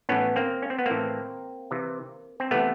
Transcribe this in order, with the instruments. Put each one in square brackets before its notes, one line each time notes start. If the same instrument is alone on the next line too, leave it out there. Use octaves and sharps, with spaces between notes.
[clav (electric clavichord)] A2 E3 B3 C#4
A#3 C4
C#4
C4
B3
A2 E3 A#3 C4
C3 E3
C4
C3 E3 A3 B3